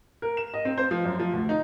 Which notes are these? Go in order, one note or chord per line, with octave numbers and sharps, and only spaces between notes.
A#4
E7
D#5
C4
C5
F3
F#2
F3
D2
D#4